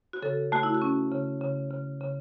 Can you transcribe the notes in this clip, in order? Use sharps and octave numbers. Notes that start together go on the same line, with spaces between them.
F#4
C#3 A4
A3 F#4
E4
F#4
C#4
C#3
C#3
C#3
C#3